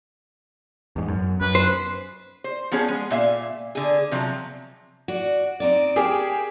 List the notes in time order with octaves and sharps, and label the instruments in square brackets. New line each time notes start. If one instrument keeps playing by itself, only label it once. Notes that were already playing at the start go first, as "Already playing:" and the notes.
[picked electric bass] E2 G#2
F#2
[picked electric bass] F#2 [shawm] B4
[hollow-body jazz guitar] C5
[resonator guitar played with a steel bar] C5
F3 B3 C#4 G#4 C#5
G#3
A#2 E5 F5
D3 G#4
C3 F3 F#3
[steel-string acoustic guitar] F#4 D5
C4 D#4 D5
[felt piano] G4 G#4 [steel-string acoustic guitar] A#4 G5 A5